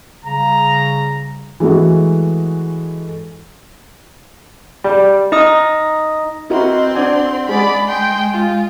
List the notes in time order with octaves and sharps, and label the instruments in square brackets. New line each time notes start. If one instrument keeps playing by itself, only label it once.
[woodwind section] C#3 G3 [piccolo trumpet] A#5
[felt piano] E3 G#3 A3 F#4
[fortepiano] G3
[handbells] D#4 D#5 D#6
[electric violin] C4 C6 [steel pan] E4 F#4 A#4 [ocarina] D#5
[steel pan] D4 D5 G#5 [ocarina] F#5
[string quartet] G#3 [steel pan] G#4 [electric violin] D5 B5
[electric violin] G5 C6 [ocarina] G#5
[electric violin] F4